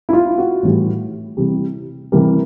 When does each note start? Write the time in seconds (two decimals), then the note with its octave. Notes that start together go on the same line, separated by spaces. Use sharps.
0.09 E4
0.13 F4
0.38 F#4
0.63 A2 E3 G3
1.37 C3 E3 G3
2.12 C3 E3 G3 A#4